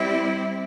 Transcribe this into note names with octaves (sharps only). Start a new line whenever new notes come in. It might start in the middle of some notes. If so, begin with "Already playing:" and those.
Already playing: G3 C4 E4